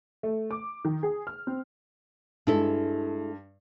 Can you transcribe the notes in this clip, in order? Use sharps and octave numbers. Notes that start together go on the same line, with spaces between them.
A3
D6
D#3
G#4
F6
C4
G2 G#3 E4 A4